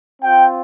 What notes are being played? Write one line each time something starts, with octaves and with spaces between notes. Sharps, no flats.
C4 F4 G5